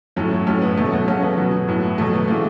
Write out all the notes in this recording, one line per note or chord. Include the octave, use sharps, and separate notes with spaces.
A2 F#3 A3 C#4
A2 F#3 A3 C#4
B3
B2 F#3 A3 C#4
F#4 A4
C#3 F#3 A3 C#4
B3
B2 F#3
A2 F#3
B2 F#3 A3
B3
C#3 E3 A3